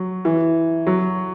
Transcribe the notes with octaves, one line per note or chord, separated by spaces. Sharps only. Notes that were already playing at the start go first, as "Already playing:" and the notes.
Already playing: F#3
E3
F#3